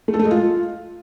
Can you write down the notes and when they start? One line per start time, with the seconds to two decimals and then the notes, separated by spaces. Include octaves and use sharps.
0.08 A3
0.14 A4
0.19 A3
0.25 G#3
0.31 F4